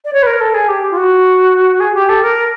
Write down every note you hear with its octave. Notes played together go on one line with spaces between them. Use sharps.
D5
C#5
B4
A#4
A4
G#4
G4
F4
F#4
G#4
G4
A4
A#4